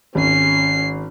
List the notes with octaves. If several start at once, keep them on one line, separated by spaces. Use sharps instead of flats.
G#1 C#4 C7